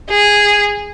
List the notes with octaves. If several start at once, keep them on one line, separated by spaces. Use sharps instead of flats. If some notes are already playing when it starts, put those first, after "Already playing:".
G#4